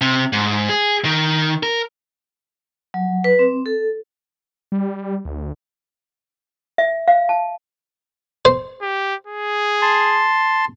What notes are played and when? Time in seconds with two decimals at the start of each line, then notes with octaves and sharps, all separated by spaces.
0.01 C3
0.33 G#2
0.69 G#4
1.05 D#3
1.63 A#4
2.94 F#3
3.24 B4
3.39 C4
3.66 A4
4.72 G3
5.25 D2
6.78 E5
7.08 F5
7.29 A5
8.45 C5
8.82 G4
9.27 G#4
9.82 A5 C6